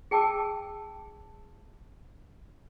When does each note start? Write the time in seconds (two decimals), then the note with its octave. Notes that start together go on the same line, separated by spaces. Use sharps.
0.11 G#4 G5 A5 D6 E6